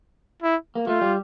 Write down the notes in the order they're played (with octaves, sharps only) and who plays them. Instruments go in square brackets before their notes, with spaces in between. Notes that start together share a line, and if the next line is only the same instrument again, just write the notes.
[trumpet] E4
[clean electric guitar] A#3
[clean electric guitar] A3 [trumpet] F4
[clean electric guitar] G3